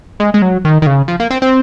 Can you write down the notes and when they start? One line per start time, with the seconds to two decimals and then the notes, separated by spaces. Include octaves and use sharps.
0.20 G#3
0.34 G#3
0.42 F#3
0.65 D#3
0.82 D#3
0.87 C#3
1.08 F3
1.20 A#3
1.30 C4
1.42 C4